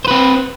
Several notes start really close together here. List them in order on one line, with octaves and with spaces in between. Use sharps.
C5 B4 C4